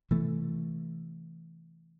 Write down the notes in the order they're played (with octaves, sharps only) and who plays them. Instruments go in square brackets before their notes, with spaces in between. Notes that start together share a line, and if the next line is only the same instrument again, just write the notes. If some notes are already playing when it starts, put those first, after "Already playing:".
[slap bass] C3 E3 A3